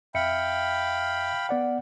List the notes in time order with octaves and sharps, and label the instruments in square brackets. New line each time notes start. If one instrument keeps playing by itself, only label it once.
[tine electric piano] F2 E5 C#7 [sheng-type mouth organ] F5 G5 B5
[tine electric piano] B3 D5 F#5